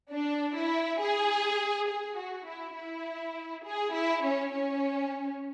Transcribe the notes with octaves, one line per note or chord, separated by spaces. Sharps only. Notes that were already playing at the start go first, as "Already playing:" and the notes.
D4
E4
G#4
G#4
F#4
E4
E4
G#4
E4
C#4
C#4